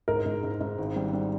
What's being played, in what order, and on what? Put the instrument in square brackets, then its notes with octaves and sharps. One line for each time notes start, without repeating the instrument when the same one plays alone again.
[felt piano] G#2 [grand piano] A#4
[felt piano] G#2
G#2
G#2
G#1
G3
G3